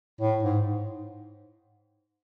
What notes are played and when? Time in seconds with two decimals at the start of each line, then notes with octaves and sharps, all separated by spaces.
0.21 A2
0.43 G#2